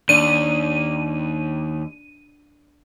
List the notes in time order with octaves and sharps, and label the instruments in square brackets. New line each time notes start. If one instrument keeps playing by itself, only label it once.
[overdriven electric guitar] D#2 [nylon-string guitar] D4 [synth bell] D#7